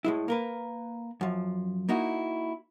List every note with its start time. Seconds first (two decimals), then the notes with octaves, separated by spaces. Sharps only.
0.05 A2 G#3 E4
0.28 A#3 A#4 B4
1.21 F#2 F3
1.89 A#3 D#4 E4 F#4